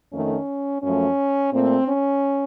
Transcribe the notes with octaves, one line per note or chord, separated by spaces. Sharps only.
F2 D#3 A3 C#4
F#2 F3 A3 C#4
A#2 A3 C4
C#4